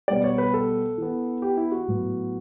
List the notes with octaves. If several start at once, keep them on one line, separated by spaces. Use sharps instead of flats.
B2 G3 B3 D5
C#5
B4
A4
E3 B3
G4
E4
F#4
A2 F#3 B3